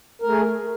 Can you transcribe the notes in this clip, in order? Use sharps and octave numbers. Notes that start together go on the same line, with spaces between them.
A3 G#4 A#4